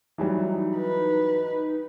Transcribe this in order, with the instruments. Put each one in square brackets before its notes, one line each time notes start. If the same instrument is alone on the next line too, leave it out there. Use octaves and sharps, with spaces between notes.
[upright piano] E3 F#3 G3 [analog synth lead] D#4
[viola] B4